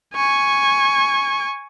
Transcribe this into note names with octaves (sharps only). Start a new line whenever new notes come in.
G#5 C#6